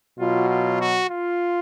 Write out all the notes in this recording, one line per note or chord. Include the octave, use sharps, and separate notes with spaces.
B2 F#3 F4
F4
F#4
F4